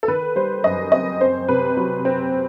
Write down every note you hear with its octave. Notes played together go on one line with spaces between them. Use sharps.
A4
D#3 B4
G3 C5
F#2 D#5
C4 D#5
C4 C5
C3 B4
F#3
C4